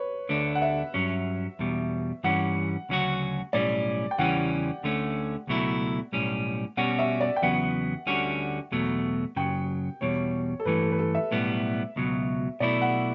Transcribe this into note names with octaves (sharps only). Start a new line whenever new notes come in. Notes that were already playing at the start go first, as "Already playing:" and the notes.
Already playing: B4 C#5
D2 D3 A3 D4
F#5
E5
G2 F#3 C#4
E2 B2 G3
G2 E3 G3 C#4 F#5
D2 C#3 F#3 C#4 F#4
B1 A2 G3 C#4 D5
G5
E2 C#3 E3 G3 C#4 F#5
D2 D3 A3 C#4
C#2 B2 F#3 A3 E4
B1 A2 G3 C#4
B2 G3 C#4 F#4 F#5
E5
D5
G5
E2 C#3 F#3 B3 F#5
D2 D3 G3 C#4 F#4
E2 B2 F#3 A3
F#2 C#3 F#3 G5
E2 B2 G3 C#5
A4
G2 E3 A3 B4
A4
B4
A4
E5
B1 A2 G3 B3
C#2 B2 F#3
B1 B2 A3 E4 D5
F#5